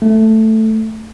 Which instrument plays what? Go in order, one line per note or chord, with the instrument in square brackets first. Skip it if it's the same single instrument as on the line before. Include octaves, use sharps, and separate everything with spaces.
[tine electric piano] A3